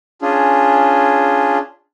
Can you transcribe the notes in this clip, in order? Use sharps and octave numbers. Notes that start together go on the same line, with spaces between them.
C#4 D4 F4 G#4